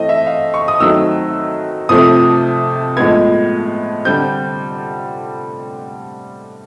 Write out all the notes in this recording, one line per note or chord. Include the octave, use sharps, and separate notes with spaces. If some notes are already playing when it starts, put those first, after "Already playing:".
Already playing: E3 A3 C4 D#5
E5
F5
C#6
D#6
D#3 F#3 A3 C4 E6
C3 F3 A3 C4 D#6
A2 F3 G#3 B3 G#6
D3 G3 C4 G6